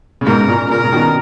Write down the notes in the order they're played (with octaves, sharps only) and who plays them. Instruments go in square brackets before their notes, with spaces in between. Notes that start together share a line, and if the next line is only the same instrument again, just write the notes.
[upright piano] C#3
[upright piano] G#2 B2 [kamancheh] A#4
[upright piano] A#2 C#3
[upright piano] A#2 C#3 [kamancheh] A#4
[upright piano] C#3
B2 D#3